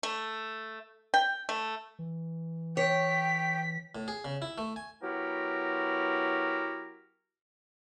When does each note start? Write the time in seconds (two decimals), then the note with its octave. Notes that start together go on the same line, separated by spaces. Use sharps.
0.03 A3
1.14 G5
1.49 A3
1.99 E3
2.77 C#5 G5 B6
3.95 A2
4.08 G#4
4.25 C#3
4.42 E4
4.58 A3
4.76 G#5
5.02 F#3 B3 E4 F#4 G4 A#4